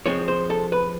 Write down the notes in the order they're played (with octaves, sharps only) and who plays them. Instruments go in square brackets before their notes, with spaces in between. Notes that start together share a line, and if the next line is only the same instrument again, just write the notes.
[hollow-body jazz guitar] F3 G#3 C4 C#5
C5
A4
B4